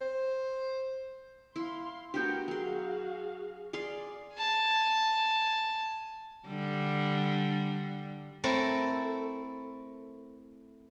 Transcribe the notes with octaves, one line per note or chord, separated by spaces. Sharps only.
C5
E4 F5 C6
A3 B3 D4 F#4 G4 A#4 G5 G6
F#3 F#4 G#4 F5 C6
G#4 D5 F5 C6
G#5 A5
D3 G3
A3 C4 E4 A4 A#4